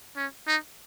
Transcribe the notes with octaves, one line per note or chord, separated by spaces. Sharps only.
C#4
D#4